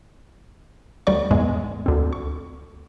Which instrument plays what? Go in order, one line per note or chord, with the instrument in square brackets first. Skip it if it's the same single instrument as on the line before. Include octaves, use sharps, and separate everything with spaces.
[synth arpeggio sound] D2 G3 D5 C#6
E2 G#2 G#3
D2 C4
C#6